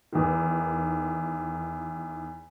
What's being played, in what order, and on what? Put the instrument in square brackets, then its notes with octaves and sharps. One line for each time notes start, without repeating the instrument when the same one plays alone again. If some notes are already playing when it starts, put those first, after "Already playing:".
[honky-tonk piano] E2 D#3